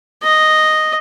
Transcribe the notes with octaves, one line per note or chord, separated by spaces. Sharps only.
D#5